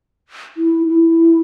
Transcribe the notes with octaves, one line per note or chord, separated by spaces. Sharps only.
E4
E4